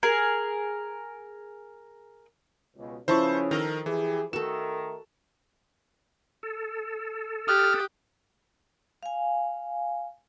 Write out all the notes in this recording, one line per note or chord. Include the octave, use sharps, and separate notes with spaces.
G#4 A#4
C#2 B2
C#3 F3 C#4 E4 B4 C5 A5 C#6
D#3 A4 A#4 D#5 A#5
E3 E4 G4 G#4
D#3 A3 F#4 A4 A#4 E7
A4
G4 D#6 F6 F#6
F5 G#5